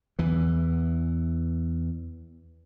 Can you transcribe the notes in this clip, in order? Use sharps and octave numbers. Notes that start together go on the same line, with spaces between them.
E2 E3